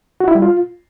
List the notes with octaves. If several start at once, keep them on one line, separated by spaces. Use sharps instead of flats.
F#4
E4
G3
F4